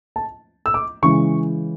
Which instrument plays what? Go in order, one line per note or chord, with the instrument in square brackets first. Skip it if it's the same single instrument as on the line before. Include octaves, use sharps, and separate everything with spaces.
[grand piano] A5
E6
D6
C#3 E3 G#3 C#6